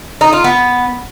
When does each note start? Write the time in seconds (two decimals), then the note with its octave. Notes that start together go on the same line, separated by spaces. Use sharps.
0.21 D#4
0.33 F4
0.44 B3